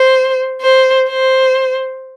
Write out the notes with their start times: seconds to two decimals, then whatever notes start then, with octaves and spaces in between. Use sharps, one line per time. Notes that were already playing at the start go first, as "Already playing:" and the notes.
Already playing: C5
0.61 C5
1.08 C5